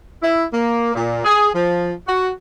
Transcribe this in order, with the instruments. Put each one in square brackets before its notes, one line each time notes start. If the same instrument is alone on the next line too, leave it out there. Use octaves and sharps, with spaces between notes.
[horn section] E4
A#3
A#2
G#4
F3
F#4